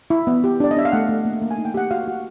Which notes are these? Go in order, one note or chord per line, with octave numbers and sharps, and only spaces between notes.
E4
B3
G4
D4 D5
D#5
D4 E5
F5
A3 F#5
A3
A#3
A#3
G#5
D#4
G5
G4 F#5
F#4 F5
F#4